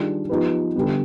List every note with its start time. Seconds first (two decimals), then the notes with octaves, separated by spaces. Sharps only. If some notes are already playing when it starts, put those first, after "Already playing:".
Already playing: D#3 G3 D4 F4 G#4
0.29 F3 B3 D#4 G4 B4
0.76 D3 G3 B3